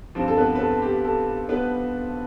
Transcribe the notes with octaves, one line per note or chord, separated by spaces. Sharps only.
G2 F3 C4
A4
B3 B4
B4
A4
G4
A4
B3 B4